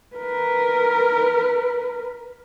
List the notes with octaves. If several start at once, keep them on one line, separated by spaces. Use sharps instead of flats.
A#4 B4